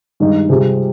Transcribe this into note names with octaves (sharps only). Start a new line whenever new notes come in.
G2 D#3 G#3 D#4
C3 G3 C4 F4 G#4